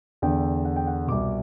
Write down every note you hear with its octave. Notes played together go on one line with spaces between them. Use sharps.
E2 D3 G5
F#5
G5
F#5
C2 B2 D6